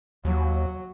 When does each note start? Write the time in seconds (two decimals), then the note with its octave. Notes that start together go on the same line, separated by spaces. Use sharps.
0.25 D#2 F#3